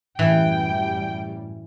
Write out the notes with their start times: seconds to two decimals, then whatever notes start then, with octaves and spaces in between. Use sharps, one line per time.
0.19 F#2 A2 E3 G3 G5